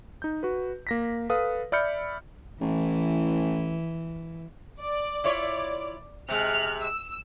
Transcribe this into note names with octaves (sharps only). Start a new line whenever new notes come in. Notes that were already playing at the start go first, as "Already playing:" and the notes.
D#4 G6
F#4 B4
A#3 A#6 B6
A4 B4 F5 D#6
D5 E5 B5 F6 G6 C#7
A1 E3
D5
E4 F4 C#5
C3 G#3 F6 F#6
E6